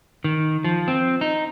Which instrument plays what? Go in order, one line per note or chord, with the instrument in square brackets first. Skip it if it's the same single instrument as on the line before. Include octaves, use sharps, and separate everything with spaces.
[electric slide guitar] D#3
F3
C4
D#4